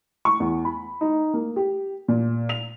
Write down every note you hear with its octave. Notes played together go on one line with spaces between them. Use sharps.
C#6
E2
B5
D#4
A#3
G4
A#2
F7